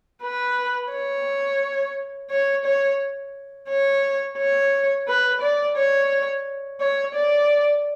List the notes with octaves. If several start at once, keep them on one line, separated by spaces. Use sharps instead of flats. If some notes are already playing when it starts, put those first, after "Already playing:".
B4
C#5
C#5
C#5
C#5
C#5
B4
D5
C#5
C#5
D5